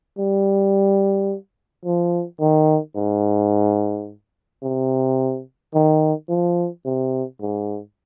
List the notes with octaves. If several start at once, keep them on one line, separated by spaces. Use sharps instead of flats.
G3
F3
D#3
G#2
C3
D#3
F3
C3
G#2